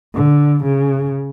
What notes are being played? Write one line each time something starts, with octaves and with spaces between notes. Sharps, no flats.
D3
C#3